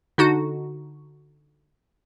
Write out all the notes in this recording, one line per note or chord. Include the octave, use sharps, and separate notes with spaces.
D3 D#4 F#4